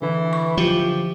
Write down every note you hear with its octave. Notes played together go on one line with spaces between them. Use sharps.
D3 E3 E4
B5 C#6
F3 F#3 F4 G4